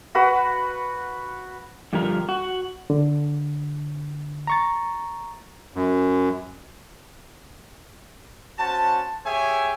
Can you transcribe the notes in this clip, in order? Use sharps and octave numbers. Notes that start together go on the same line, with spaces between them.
F#4 B4 F#5
G2 D3 F3 G4 A#4
F#4
D3
A#5 C#6 A6
F#2
C#4 F#4 C5 A5
G4 G#4 C#5 E5 G5 G#5